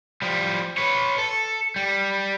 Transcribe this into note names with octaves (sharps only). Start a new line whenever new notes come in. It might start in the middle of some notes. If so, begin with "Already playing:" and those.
F3 G3
B4 C#5
A4
G3